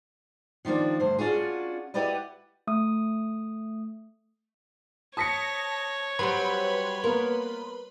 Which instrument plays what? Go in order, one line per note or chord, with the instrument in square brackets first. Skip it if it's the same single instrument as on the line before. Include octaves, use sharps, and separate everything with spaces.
[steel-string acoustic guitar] D#3 F3 G3 A#3 D4
D2 G2 C5
C#4 D4 F4 F#4 G#4
E4 F#4 G4 B4 D5 D#5
[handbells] A3 D#6
[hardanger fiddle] C#5 [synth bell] A5 A#6 [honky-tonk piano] D#6 B6 C#7
[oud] F#3 G3 C4 [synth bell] B4 B5 C6
[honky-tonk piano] A#3 B3 [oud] A#4